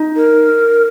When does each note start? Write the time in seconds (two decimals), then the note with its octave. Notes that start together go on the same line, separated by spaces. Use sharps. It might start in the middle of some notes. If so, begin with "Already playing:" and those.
Already playing: D#4
0.16 A#4